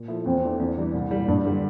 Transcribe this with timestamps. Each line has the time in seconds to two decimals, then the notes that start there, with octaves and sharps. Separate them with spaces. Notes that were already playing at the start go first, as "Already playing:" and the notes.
Already playing: A#2
0.08 F3 A3 E4
0.26 E2 C4
0.43 E3 A3 D4
0.60 E2
0.77 E3 G3 D4
0.94 C2
1.11 A#2 G3
1.28 G2 D4
1.45 D3 G3